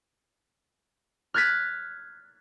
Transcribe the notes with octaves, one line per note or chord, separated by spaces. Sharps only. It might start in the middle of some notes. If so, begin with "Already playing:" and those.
F6 F#6 G#6 A6 B6